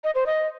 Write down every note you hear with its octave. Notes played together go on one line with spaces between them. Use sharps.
D#5
C5
D#5